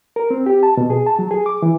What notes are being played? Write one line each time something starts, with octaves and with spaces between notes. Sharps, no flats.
A#4
C4
G4
A5
B2
G#4
A5
F#3
G#4
D6
E3